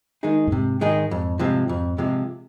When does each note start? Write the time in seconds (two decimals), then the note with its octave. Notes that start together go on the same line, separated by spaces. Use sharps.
0.23 D#3 G#3 D#4 G#4
0.47 G2
0.52 G#2 C3
0.81 D#3 G#3 D#4 G#4
1.11 F2
1.39 C3 F3 G#3
1.69 F2
1.98 C3 F3 G#3